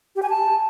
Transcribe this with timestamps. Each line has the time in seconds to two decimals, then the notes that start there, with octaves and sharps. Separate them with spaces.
0.16 G4
0.23 G#5
0.29 A5